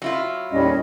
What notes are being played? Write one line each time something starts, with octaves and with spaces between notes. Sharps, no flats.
F#3 E4 F4
D#2 A2 G3 C#4 D#5